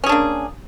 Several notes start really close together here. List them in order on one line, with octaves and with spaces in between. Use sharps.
C#4 G#4 D4 A#3